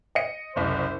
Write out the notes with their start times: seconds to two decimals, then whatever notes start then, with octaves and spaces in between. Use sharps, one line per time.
0.15 D#5 C#7
0.56 F#1 C2 C5